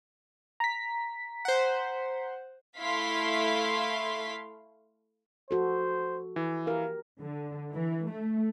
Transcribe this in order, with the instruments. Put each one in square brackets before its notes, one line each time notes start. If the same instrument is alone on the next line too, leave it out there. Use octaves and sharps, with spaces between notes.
[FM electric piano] A#5 B6
[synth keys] C5 F#5
[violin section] A3 E4 F5 C6 B6
[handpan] F3 F#4 A4 [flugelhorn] C5
[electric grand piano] E3
[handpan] G4 A#4 [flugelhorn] F5
[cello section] D3
E3
A3